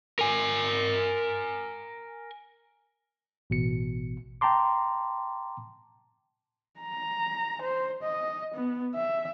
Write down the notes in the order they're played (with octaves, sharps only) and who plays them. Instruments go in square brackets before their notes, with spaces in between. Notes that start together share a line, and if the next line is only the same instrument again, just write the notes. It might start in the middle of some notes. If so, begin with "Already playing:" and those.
[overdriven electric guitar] A#4 G#5
[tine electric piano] A1 B2 C#7
G5 A5 A#5 C6 D6
[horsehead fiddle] A#5
C5
D#5
B3
E5